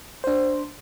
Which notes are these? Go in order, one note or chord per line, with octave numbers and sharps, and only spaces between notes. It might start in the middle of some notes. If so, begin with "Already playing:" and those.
D4 C5